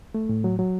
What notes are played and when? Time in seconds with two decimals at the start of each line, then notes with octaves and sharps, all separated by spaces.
0.15 A3
0.29 A2
0.44 F#3
0.59 F#3